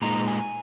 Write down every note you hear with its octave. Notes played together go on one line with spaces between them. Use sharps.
A#2 G#3 D#4 A#5
G#5